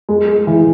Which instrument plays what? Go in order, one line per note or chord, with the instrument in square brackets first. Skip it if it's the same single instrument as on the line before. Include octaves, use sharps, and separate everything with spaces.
[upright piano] G#3
G#3
E3